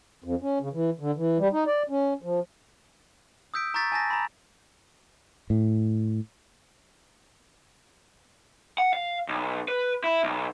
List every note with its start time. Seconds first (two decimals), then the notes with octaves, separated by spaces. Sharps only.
0.24 F2
0.42 C#4
0.60 C#3
0.73 E3
1.00 D3
1.16 E3
1.39 G3
1.53 D#4
1.67 D5
1.89 C#4
2.22 F3
3.54 D#6 E6 G6 B6 D7
3.74 A#5 C#6 G6 A6 B6
3.92 G#5 A5 A6 A#6
4.10 A#5 B5
5.50 A2
8.78 F#5
8.93 F5
9.28 B1
9.68 B4
10.04 E4
10.24 B1